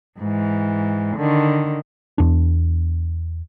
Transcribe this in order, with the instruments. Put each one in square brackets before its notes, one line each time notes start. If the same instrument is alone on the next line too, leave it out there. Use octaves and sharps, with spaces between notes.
[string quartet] G#2 E3
D3 D#3
[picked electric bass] E2 D4